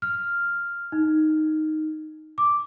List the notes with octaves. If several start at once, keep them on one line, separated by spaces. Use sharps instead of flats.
F6
D#4
D6